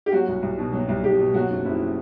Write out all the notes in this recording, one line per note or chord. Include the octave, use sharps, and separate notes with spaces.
G4
F#3 F#4
C2
C2
B2
F#3
C2
C2 G4
B2
F#3 F#4
F#1
F#1 E4